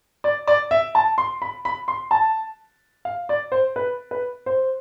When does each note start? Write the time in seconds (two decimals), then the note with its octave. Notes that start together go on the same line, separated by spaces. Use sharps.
0.24 D5
0.47 D5
0.71 E5
0.95 A5
1.18 C6
1.42 B5
1.65 B5
1.88 C6
2.11 A5
3.05 F5
3.29 D5
3.52 C5
3.76 B4
4.11 B4
4.46 C5